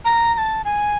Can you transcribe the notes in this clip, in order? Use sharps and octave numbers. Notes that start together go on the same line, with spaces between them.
A#5
A#5
A5
G#5